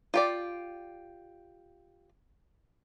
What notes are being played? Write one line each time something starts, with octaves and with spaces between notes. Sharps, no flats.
F4 G4 D5